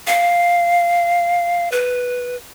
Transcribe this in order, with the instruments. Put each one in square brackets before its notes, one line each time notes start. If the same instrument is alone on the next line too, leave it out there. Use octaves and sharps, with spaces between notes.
[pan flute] F5
B4